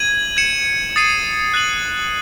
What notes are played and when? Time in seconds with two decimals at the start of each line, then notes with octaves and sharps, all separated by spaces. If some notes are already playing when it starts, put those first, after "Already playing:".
Already playing: G#6 D#7 F#7
0.37 G#6 C#7 E7
0.96 D#6 A6 C7 D#7
1.54 F#6 A6 D#7 F#7